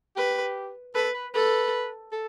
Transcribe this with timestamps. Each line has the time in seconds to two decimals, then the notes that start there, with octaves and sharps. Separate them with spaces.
0.16 G4 B4
0.95 A4 B4
1.14 B4
1.34 A4 B4
2.13 A4